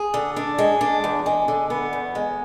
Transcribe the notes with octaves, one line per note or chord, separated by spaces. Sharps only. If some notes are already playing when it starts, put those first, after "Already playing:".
Already playing: G#4
D3
D4
G#3
D4
E2
G#3
D3
B3
E2
G#3